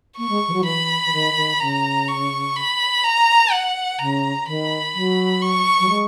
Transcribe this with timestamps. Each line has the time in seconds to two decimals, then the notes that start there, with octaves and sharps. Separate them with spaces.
0.17 A#3 C#6
0.29 G#3
0.48 E3
0.53 F#3
0.65 E3 B5
1.06 E3
1.13 D#3
1.36 D#3
1.60 C#3 A#5
2.08 C#6
2.56 B5
3.04 A#5
3.51 F#5
3.99 C#3 A#5
4.46 D#3 B5
4.94 F#3
5.42 C#6
5.80 F#3
5.89 G#3